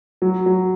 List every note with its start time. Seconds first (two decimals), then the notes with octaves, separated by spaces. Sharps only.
0.22 F#3
0.46 F#3